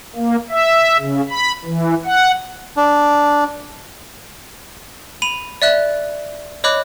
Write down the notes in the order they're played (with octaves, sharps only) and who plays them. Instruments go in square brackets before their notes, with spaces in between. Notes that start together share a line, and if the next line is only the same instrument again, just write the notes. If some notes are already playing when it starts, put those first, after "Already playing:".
[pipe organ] A#3
E5
C#3
B5
E3
F#5
[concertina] D4
[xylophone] B5 D#7 F7
D5 E5 F#6
C#5 D#5 B5 D6 F#6